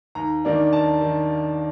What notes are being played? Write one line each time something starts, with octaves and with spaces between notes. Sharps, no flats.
D#2 A#5
D#3 A#3 D4
D#2 A5
D#3